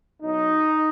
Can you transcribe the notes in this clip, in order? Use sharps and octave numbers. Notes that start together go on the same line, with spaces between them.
B2 F#3 D#4